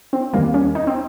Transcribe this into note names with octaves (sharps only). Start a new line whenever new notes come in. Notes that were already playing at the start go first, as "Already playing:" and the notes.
C4
D#2 D#3 G3 A#3
C#4
D#4
C4